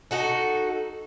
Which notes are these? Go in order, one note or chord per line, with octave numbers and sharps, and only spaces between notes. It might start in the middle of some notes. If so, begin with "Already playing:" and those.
D#4 F#4 A4